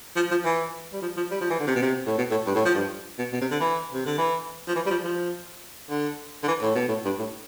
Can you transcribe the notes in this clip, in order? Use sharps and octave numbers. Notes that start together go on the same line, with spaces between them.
F3
F3
E3
G3
F3
F3
G3
F3
E3
D3
C3
B2
C3
A2
B2
A2
G2
A2
F3
G2
B2
B2
C3
D3
E3
C3
D3
E3
F3
E3
G3
F3
F3
D3
D3
E3
A2
B2
A2
G2
A2